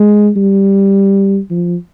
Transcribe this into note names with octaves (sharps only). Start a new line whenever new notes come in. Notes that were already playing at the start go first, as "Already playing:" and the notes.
Already playing: G#3
G3
F3